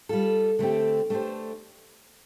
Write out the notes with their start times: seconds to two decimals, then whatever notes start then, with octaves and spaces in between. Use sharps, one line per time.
0.09 G3 F4 A4
0.59 D3 A3 C4 G4
1.10 A3 D4 G4 C5